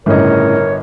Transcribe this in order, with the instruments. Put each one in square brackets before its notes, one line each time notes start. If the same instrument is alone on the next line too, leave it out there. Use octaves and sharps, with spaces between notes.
[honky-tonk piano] G1 D#5 [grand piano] A2 C#3 [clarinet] A#4 [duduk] C#5